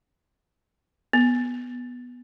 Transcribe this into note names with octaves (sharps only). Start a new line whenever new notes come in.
B3